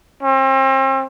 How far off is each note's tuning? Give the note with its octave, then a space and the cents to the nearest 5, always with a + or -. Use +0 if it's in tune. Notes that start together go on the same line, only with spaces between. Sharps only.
C4 +40